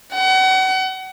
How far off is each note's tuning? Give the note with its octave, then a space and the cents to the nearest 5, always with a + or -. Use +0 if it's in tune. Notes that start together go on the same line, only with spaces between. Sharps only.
F#5 +35